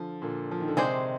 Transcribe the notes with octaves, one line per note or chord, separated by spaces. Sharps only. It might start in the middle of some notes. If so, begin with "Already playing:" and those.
Already playing: D3 F3
A#2 D3
F3
D#3
D3
C3 D#3 G#3 D4 G#4 C5